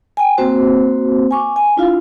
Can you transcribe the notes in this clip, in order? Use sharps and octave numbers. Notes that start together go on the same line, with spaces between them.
G5 G#5
A#3 C4 F#4 C5
G#5 C#6 D6
G#5
D4 E4 F4 F5